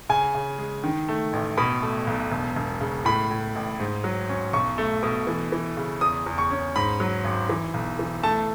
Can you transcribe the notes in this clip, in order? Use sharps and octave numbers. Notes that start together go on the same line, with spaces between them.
C#3 G#5
C#3
G#3
D#3
A3
A1
B2 B5
A3
B1
E1
E1
C#3
A2 B5
A2
A1
G#2
F#3
C#4
B1 C#6
A3
B2
E3
E3
C#3
E2 D#6
E2
C#6
C#4
G#2 B5
F#3
G#1
E3
B1
E3
A3 A5